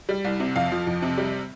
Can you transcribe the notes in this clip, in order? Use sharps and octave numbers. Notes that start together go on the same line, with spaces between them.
G3
C2
C3
F2 F5
F3
F2
C3
G3